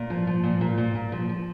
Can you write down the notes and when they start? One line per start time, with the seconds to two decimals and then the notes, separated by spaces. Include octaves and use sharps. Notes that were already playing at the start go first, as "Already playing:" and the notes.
Already playing: A#2
0.10 F3
0.27 F3
0.43 A#2
0.61 A#2
0.78 A#2
0.95 A#2
1.12 F3
1.29 F3